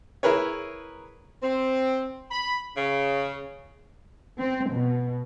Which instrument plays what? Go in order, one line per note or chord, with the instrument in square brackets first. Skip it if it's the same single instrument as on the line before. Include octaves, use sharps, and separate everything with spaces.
[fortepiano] E4 G#4 A#4 B4 C#5
[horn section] C4
B5
C#3
[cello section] C4
B2